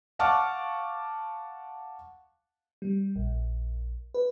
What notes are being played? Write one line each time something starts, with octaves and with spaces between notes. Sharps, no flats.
F5 F#5 A5 C#6 D6 F6
G3
A#1
B4